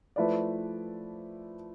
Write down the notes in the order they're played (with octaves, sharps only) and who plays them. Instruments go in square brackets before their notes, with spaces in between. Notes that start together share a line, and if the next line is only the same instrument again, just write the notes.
[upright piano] F3 A3 E4 B4 D5